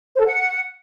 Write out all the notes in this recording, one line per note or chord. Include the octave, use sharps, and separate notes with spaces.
C5
A4
F#5